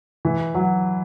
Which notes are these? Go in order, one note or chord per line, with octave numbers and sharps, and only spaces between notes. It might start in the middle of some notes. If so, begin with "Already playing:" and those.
E3
F#3